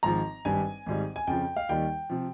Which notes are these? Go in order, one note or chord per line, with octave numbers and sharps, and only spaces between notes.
G#1 G#2 F3 A#5
G#1 G2 G3 G#5
G#1 G#2 G3
G#5
F2 C#3 F3 G5
F5
D#2 D#3 G3 G5
C3 F3